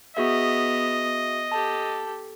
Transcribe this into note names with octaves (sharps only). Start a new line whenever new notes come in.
B3 F#4 G#4 D#5 E5
G4 A4 A5